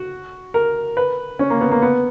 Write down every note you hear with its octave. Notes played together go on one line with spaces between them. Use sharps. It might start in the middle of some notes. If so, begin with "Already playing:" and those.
Already playing: F#4
A#4
B4
C#4
A#3
B3
A#3
B3